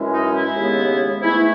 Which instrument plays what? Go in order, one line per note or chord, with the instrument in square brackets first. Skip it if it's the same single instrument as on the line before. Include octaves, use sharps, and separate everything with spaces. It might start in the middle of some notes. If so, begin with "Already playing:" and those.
Already playing: [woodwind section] F#2 E3 G#3 C#4
D#4
E4
D#2 C#3 G#3 B3
G#2 E3 A3 E4